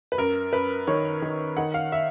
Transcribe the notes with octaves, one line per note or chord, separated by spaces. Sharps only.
B4
F#2 A#4
F#2 B4
D#3 C#5
D#3
D#3 F#5
F5
E5